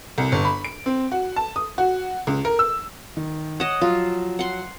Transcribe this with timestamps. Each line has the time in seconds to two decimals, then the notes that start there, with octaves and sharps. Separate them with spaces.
0.18 C2
0.32 G1
0.45 B5
0.65 D7
0.86 C4
1.12 F#4
1.36 A5
1.56 D#6
1.78 F#4
2.27 C#2
2.45 A#4
2.59 E6
3.17 D#3
3.60 C#5 D#5 F#5 E7
3.81 F3 F#3 F4
4.39 F#5 C6